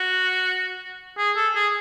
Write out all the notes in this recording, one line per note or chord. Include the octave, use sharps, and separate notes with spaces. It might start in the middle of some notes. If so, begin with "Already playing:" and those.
Already playing: F#4
G#4
A4
G#4